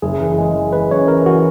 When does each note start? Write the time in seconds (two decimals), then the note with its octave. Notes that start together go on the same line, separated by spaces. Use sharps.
0.02 F#1 G#4
0.21 E3
0.38 G#3
0.55 E3
0.73 G#3 B4
0.91 F#2 C#5
1.08 E3 A#4
1.26 E3 F#4